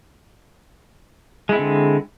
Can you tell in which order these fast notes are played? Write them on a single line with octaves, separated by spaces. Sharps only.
G#3 E4 C4 D3